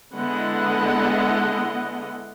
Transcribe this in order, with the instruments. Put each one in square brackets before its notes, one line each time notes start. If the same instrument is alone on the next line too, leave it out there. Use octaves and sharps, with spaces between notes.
[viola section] D3 G#3 B3 E4 D#5 F#5